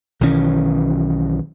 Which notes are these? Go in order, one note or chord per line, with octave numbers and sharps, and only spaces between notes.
B1 D#3 E3 C#4